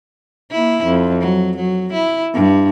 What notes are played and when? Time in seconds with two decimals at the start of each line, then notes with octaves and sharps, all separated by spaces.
0.51 A#3 E4
0.84 F2
1.20 F#3
1.56 F#3
1.93 E4
2.34 G2